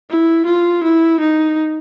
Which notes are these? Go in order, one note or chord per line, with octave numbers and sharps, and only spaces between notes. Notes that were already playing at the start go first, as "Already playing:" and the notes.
E4
F4
E4
D#4